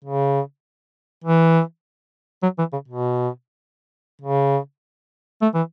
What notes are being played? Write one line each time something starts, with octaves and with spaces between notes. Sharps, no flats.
C#3
E3
F#3
E3
C#3
B2
C#3
A3
E3